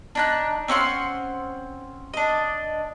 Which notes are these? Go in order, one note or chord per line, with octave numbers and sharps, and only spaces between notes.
D4 D#4 F#6
C4 C#4 F#5 C6
D4 D#5